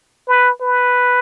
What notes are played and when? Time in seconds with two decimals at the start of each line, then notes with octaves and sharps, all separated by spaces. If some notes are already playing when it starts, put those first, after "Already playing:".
0.28 B4
0.61 B4